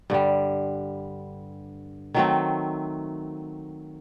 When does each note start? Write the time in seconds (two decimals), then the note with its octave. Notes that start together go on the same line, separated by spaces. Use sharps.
0.10 G2 D3 G3
2.14 D#3 F#3 A3 C4